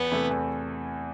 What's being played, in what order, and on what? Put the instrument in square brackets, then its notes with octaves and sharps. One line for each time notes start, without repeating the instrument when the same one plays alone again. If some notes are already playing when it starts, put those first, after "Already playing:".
Already playing: [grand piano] E2 [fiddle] B3
[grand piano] C3 E3 A3
E2